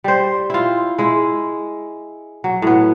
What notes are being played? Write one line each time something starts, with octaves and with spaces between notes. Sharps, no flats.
G3 C5
E4 F4
G#3 E4
F#3
A2 B3